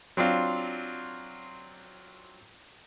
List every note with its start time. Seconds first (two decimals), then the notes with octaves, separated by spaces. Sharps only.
0.17 F#3 C4 D4 F4